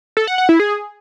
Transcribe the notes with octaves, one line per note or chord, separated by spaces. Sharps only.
A4
F#5
F#5
E4
G#4